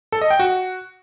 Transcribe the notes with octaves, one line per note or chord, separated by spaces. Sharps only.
A4
D#5
G5
F#4